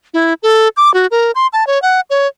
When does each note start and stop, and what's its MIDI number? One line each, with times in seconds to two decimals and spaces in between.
0.14 0.34 64
0.43 0.68 69
0.77 0.92 86
0.94 1.07 66
1.11 1.31 70
1.35 1.47 84
1.53 1.66 81
1.67 1.81 73
1.82 2.00 78
2.10 2.27 73